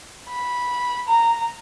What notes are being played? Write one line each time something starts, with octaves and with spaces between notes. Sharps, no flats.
B5
A#5